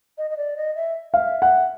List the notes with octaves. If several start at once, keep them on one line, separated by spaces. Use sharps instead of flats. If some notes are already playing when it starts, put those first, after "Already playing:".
D#5
D#5
D5
D#5
E5
E5 F5
F#5